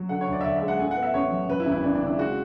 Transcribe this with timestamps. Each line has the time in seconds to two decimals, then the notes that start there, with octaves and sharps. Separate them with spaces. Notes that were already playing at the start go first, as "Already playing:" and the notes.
Already playing: F#3
0.09 D3 F#5
0.21 C#5
0.27 D2
0.33 D5
0.41 E5
0.44 D2 D5
0.56 G#3 E5
0.68 F#5
0.79 A2 G#5
0.91 F#5
0.96 B3
1.03 E5
1.14 A1 C#5
1.31 F#3
1.49 F#2 B4
1.60 E4
1.66 G#1
1.72 E4
1.84 G#1 D4
1.95 D4
2.01 C#3
2.06 E4
2.18 G#3 F#4